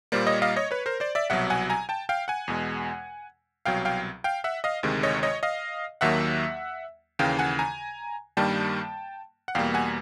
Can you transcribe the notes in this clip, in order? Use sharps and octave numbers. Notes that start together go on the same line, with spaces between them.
A#2 G3 A#3 C5 D5
C#5 D#5
D#5 F5
C#5 D#5
B4 C#5
A#4 C5
C5 D5
D5 E5
C2 B2 F#3 E5 F#5
F#5 G#5
G#5 A#5
G5 A5
F5 G5
F#5 G#5
E2 B2 G#3
C2 B2 F#3 F5 G5
F5 G5
F5 G5
E5 F#5
D#5 F5
D2 C3 D#3 G#3
C#5 D#5
C#5 D#5
D#5 F5
D#2 D#3 F#3 A#3 E5 F#5
D#2 C#3 E3 F5 G5
F#5 G#5
G#5 A#5
G2 D#3 G3 A#3 G5 A5
F#5
E2 B2 G3 A#3 F5 G5
F#5 G#5